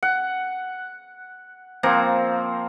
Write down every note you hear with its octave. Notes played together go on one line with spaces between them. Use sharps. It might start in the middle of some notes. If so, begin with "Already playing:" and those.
F#5
F3 A#3 C4 A#5